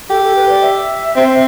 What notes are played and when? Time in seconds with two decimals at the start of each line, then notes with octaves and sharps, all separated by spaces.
0.10 G4 A4
0.23 A4
0.36 B4
0.49 D5
0.63 E5
1.16 C4